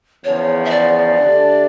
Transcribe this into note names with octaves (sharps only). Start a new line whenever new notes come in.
E2 C#3 F3 C#5
E5
D5
D3 A3 D4 G4